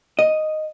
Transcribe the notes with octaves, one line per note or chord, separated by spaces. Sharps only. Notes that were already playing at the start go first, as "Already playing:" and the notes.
D#5